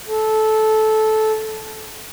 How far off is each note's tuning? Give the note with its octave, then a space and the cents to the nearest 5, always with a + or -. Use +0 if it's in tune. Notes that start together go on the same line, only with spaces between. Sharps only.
A4 -15